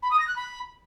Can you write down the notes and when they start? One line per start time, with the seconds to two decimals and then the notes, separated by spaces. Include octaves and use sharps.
0.03 B5
0.11 D#6
0.19 A#6
0.28 F#6
0.36 B5